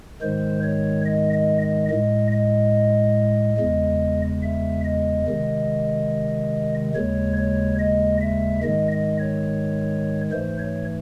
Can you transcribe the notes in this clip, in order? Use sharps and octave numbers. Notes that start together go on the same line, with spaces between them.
G#2 D#3 G#3 C5
C#5
D#5
D#5
D#5
A2 G#3 D#5
D#5
E2 C#3 G#3
E5
D#5
C3 D#3 G#3
D#2 C#3 G#3 C#5
C#5
D#5
E5
G#2 D#3 G#3 D#5
D#5
C#5
G#2 E3 A3 C5
C#5